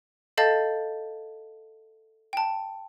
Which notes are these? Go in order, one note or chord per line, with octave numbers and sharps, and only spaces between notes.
A4 D#5 F5 A5 G6 A6
G5 A5